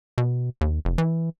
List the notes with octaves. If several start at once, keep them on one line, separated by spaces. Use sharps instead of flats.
B2
D#2
F1
E3